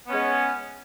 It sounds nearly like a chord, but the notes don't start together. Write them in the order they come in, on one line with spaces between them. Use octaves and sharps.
B3 C#4 G#3